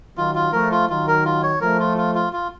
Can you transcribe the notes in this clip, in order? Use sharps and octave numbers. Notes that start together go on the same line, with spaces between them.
D#3 F#3 F4
F4
F3 A3 A#4
F4
D#3 F#3 F4
A#4
F4
C#5
F3 A3 A#4
F4
F4
F4
F4